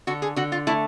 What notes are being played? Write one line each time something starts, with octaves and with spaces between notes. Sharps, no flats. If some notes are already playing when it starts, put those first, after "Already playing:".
D3 F#4
G#4
D3 F#4
F4
A3 E4